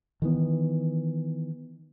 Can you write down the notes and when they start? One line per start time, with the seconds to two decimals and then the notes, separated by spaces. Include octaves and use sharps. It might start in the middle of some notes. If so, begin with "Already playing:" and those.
0.22 D#3 E3 B3